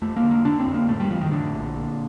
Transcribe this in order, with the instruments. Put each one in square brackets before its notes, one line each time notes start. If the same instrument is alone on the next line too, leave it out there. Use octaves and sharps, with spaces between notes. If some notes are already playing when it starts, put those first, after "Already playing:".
[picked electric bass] F2 A3
A#3
D3
A#3
D3 D4
C4
F2
A#3
A2 A3
G3
A2 F3
D#3
A2 D3
A#1
A#2